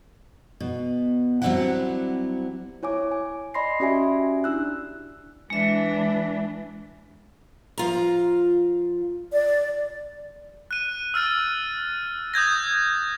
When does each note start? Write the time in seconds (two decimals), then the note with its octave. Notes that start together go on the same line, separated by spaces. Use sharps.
0.60 B2
1.42 F#3 G3 C4 D4 E4 F#5
2.83 E4 C#5 G#5 D6
3.11 G#5
3.54 D5 D#5 B5 C6 A#6 C7
3.80 C#4 F#4 G4 D5 E5 G#5
4.44 D4 E4 E6 F#6
5.50 E3 G#3 D4 E5
7.78 F3 F4 A#5
9.32 D5
10.71 F#6 D#7
11.14 E6 F6 A6 D#7
12.34 D#6 G6 G#6 A#6